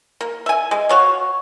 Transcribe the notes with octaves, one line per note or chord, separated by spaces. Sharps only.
A#3
E5 G#5
G#3
F#4 C#5 F5